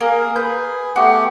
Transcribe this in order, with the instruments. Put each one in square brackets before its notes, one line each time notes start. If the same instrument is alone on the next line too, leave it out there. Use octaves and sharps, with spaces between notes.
[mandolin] A#3 [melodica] G#4 A#4
[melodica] G#4 [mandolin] B4 G6
[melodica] A3 B3 G4 [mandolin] F#4